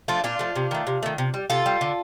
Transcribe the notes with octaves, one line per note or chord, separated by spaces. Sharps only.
F3 A3 D4 F4
A#2 D4 F4
F3 A3
C3
D#3 A3
C3
D#3 A3
C3
G3
C3 F4 A4
G3
D3